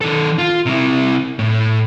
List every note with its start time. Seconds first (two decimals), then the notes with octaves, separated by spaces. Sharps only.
0.01 D#3 A4
0.38 F4
0.66 C3 E4
1.39 A2